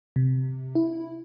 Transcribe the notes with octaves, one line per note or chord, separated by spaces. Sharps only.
C3
E4